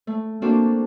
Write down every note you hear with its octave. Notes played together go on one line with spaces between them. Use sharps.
A3
A3 A#3 C4 D4 F#4 A4